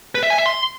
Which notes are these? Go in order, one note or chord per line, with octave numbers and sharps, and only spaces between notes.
B4
E5
G#5
E5
C6